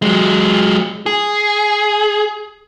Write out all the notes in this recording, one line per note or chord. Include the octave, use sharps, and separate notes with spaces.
F#3 G#3
G#4